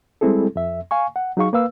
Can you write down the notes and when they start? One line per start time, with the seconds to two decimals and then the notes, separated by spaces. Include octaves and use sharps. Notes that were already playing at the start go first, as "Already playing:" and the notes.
0.21 G3 G#3 C4 E4 G#4 A4
0.56 F2 E5
0.91 F5 G#5 C#6
1.16 F#5
1.37 F#3 D#4 G#4 F5 C#6
1.53 A#3 B4 F5 E6